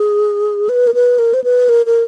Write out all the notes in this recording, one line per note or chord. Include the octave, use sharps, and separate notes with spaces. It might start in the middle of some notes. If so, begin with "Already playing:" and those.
Already playing: G#4
B4
A#4
B4
A#4
C5
B4
A#4
A#4